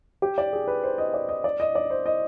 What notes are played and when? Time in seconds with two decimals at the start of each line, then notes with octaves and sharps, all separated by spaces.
0.22 G4
0.38 D5
0.53 G#4
0.68 B4
0.84 C5
0.98 D#5
1.14 D5
1.29 D#5
1.44 D5
1.60 D#5
1.75 D5
1.90 C5
2.06 D#5